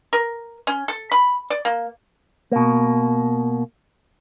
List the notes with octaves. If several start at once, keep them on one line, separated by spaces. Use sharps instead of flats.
A#4
C#4
A4
B5
D5
A#3
B2 A#3